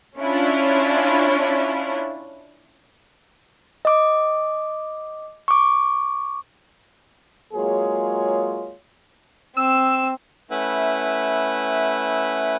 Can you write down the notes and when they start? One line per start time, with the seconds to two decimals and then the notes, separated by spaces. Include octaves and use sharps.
0.18 C#4 D4 E4 F4
3.85 D#5 D6
5.48 C#6 D6
7.53 F#3 G#3 A#3 F4 G#4 C#5
9.57 C4 E6
10.50 A3 C#4 E4 B4 E5 F#5